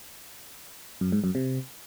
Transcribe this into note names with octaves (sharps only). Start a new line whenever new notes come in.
F#2
G#2
F#2
C3